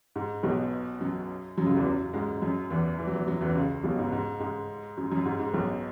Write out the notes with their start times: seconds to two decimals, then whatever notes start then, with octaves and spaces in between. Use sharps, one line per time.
0.16 G#2
0.43 B1 B2
1.00 F#2 F#3
1.57 F#2 F#3
1.66 C#2 C#3
1.76 E2 E3
1.86 F#2 F#3
2.13 G#2 G#3
2.42 F#2 F#3
2.70 E2 E3
2.98 E2 E3
3.08 F#3
3.14 E2 E3
3.27 F#2 F#3
3.41 E2 E3
3.55 C#2 C#3
3.83 B1 B2
3.99 G#2
4.12 G#2
4.40 G#2 G#3
4.97 F#2 F#3
5.11 F#2 F#3
5.25 G#2
5.40 G#2
5.53 B1 B2